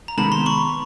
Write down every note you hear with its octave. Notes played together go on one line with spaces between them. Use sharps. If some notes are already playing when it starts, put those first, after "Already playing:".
A#5
C3 D#3 G#3 B3 A5 B5
A#5 C6
B5 C#6